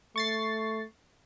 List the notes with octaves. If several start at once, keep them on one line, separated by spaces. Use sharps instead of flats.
A3 C#6 A6 C7